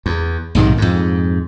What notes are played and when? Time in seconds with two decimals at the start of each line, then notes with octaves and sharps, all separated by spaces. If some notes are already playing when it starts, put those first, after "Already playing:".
0.06 E2
0.55 B1 G#2 C3 D#3
0.78 F2 G#2